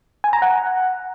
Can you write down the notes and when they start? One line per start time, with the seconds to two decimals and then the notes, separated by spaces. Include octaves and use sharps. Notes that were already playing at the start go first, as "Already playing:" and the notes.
0.24 G#5
0.33 A#5
0.42 F#5